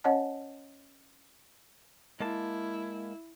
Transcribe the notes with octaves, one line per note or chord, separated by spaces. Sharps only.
C#4 C#5 D#5 F#5 A5
G#3 A#3 E4 A5